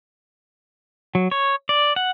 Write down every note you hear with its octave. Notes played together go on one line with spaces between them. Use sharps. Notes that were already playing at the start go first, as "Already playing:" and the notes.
F#3
C#5
D5
F#5